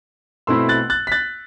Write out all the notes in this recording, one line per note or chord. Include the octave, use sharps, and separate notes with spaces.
B2 A3 C4 E4 C6 E6
F#6 A6
F#6 A6
B6
F#6 A6